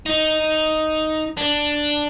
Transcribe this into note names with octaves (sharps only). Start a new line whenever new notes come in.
D#4
D4